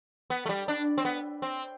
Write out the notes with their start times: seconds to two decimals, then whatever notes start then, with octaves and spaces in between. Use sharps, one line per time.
0.30 B3
0.46 A3
0.49 G3
0.68 D4
0.98 C4
1.05 B3
1.42 C4